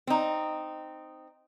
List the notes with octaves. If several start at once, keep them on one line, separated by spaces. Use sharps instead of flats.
C4 D#4